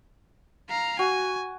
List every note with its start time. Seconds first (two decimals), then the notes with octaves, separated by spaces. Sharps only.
0.69 F5 A#5
0.99 F#4 G#5